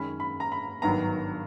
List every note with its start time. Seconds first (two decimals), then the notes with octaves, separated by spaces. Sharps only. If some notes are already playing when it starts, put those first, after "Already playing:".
Already playing: F#2 D#3 G#3 C#4 B5
0.20 B5
0.40 A#5
0.52 B5
0.82 G#1 G2 D#3 F#3 B3 A#5